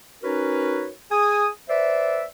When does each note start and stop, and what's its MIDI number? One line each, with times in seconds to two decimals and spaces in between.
0.23 0.89 61
0.23 0.89 63
0.23 0.89 66
0.23 0.89 70
0.23 0.89 71
0.23 0.89 73
1.11 1.47 68
1.11 1.47 80
1.11 1.47 87
1.69 2.25 71
1.69 2.25 72
1.69 2.25 74
1.69 2.25 76